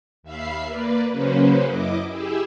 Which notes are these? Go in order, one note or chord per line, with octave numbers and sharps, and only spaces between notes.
D#2 E5 F5 B5 C7
A#3 B4 D5
C#3 F#3 A#3 C#4 B4 C5
F#2 E4 D#5 D6
E4 G4 G#4 E5